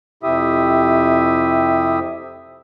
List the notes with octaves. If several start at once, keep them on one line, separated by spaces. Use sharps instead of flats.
F2 C3 E4 G4 E5 D#6